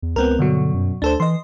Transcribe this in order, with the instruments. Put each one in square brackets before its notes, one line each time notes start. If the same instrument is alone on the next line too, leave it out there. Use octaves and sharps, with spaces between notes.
[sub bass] E2
[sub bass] C#2 [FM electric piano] B3 C4 A#4
[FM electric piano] G2 B2 F#3 [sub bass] D3
[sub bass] F#2
[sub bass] D2 [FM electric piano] D4 A4 C5
[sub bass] E3 [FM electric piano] D#5 C6